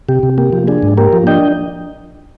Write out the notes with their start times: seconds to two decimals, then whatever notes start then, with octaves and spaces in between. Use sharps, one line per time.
0.09 C3 G4
0.23 C3
0.38 A#3 G4
0.53 F3
0.67 D4 G#4
0.83 G#2
0.97 A#3 G4 A#4
1.13 F3
1.27 D4 D#5 G5